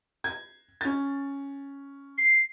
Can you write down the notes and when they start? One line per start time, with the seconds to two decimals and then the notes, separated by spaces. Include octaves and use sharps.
0.24 G#6
0.81 C#4 A6
2.17 C7